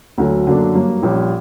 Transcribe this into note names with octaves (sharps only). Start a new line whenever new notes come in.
D2 D3 F#3
F#2 D3 F#3 A#3 D4
G2 F#3 A#3
A#1 A#2 G3 C#4 G4